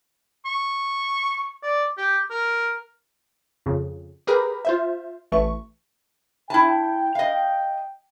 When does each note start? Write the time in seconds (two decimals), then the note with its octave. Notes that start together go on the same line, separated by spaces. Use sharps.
0.45 C#6
1.63 D5
1.97 G4
2.30 A#4
3.66 F2 C#3
4.27 G4 G#4 A#4 B4 A#5 B5
4.65 F4 C5 E5
5.32 A1 E3 A3 C#6
6.50 E4 G5 A5
7.15 D#5 F5